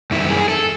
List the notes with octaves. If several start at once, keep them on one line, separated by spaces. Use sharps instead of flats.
F#2 D#3 G3 E4
G#4
A4